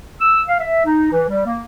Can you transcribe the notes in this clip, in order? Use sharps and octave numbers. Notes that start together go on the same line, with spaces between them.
E6
F5
E5
D#4
E3
G3
A#3